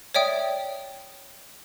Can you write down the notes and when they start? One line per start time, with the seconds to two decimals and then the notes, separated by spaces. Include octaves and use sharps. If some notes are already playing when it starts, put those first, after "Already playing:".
0.14 C#5 D5 E5 G5 D#6